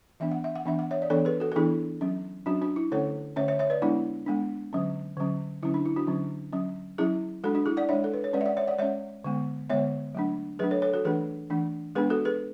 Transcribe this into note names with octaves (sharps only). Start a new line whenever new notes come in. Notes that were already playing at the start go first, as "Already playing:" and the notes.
E3 B3 D4 E5
F#5
E5
F#5
E3 B3 D4 E5
F#5
C#5 E5
D5
E3 B3 D4 A4 C#5
G#4 B4
F#4 A4
A4
E3 B3 D4 E4 G#4
F#3 C#4
F#3 C#4 D4 F#4
D4 F#4
E4
D3 A3 C#4 A4 C#5
D3 A3 C#4 C#5 E5
C#5 E5
C#5 E5
B4 D5
G#3 B3 D4 E4
G#3 B3 D4
D3 F#3 C#4
D3 F#3 C#4
D3 F#3 C#4 E4
D4
E4
D4 F#4
D3 F#3 C#4
F#3 C#4
F#3 C#4 E4 G#4
G#3 D4 F#4 A4
D4 F#4
E4 G#4
D5 F#5
G#3 D4 C#5 E5
A4
B4
C#5
G#3 C#4 B4 D5
E5
D5 F#5
C#5 E5
D5 F#5
G#3 C#4 C#5 E5
D3 G#3 B3
D3 G#3 B3 C#5 E5
F#3 A3 D4
F#3 A3 D4 G#4 B4
A4 C#5
A4 C#5
F#4 A4
E3 A3 D4 G#4 B4
E3 A3 D4
G#3 B3 D4 G#4 B4
F#4 A4
G#4 B4